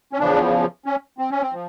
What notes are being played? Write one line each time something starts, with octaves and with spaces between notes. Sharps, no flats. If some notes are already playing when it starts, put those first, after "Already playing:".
C#4
E2 C#3 F3 D4
C#4
C4
C#4
C4
F3